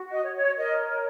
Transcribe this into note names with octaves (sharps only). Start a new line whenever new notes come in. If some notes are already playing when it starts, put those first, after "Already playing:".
Already playing: F#4
D#5
C#5
C#5
A#4 D#5
C#5